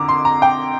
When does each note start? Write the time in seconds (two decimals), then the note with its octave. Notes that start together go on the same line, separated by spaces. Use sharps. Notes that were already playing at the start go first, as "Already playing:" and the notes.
Already playing: F2 D3 A#5 D6
0.09 C6
0.25 A#5
0.42 G5